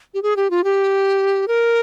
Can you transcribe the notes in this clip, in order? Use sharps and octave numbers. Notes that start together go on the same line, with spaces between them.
G4
G#4
G4
F4
G4
A#4